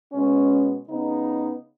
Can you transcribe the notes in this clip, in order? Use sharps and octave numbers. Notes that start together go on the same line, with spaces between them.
B2 G#3 C#4
C#3 B3 D#4